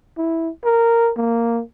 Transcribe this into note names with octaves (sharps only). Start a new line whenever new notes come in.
E4
A#4
A#3